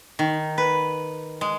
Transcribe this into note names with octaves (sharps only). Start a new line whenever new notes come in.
D#3
B4
G#3